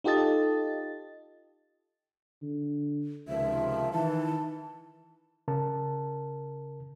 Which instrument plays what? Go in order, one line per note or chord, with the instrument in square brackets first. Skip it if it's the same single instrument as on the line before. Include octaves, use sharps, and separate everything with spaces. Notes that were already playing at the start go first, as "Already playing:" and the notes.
[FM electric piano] D#4 F4 G4 A4 D#5 A6
[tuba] D3
[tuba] C#2 [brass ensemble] C3 D#3 F3 [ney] E5
[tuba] D#3 [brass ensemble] E3 [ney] A5
[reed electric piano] C#3 A#4 A5